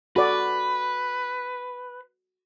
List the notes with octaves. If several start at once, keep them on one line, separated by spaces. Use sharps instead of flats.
F#4 A4 B4 D5